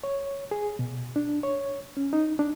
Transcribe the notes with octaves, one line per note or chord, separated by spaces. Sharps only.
C#5
G#4
B2
D4
C#5
C#4
D#4
D4